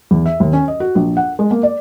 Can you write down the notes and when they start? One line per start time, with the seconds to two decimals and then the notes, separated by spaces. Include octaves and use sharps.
0.11 E2
0.26 E5
0.40 D#2
0.53 C#4
0.68 D#5
0.80 F#4
0.95 A#1
1.17 F#5
1.39 G#3
1.51 A#3
1.63 D5